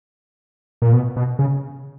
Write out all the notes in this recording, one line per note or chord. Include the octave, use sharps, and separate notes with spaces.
A#2
B2
B2
C#3